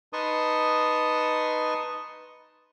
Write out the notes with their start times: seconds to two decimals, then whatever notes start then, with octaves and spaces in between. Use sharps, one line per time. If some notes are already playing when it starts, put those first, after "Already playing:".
0.13 D#4 B4 A5 C6 C#6 D#6